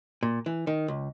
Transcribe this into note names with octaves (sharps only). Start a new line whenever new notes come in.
A#2
E3
D#3
C#2